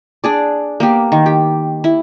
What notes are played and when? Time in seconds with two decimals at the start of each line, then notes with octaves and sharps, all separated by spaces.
0.24 D4 G#4 D5
0.80 A#3 B3 G4
1.12 D#3
1.26 G4
1.84 E4